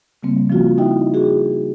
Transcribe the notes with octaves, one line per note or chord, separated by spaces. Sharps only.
C#3 G3 A#3 C4
F3 A#3 C#4 F4 F#4
D#4 E4 F#4 D#5 E5 G5
F#4 G#4